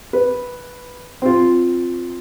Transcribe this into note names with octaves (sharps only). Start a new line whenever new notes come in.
B4
C4 F4